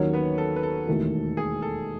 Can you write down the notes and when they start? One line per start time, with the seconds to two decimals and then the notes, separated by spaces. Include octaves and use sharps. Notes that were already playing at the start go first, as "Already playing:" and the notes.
Already playing: D#2 D#3 F#3 C#4 C#5
0.13 B3 B4
0.38 A4
0.56 B4
0.63 A4
0.87 E1 D#2 D#3 A3
1.37 G#4
1.62 A4